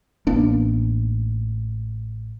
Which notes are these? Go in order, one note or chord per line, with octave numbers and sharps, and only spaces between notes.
A1 A#3 B3 D4